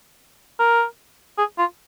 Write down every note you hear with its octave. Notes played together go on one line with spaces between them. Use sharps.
A#4
G#4
F4